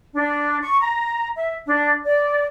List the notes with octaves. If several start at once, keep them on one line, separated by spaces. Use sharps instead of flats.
D4
C#6
A#5
E5
D4
D5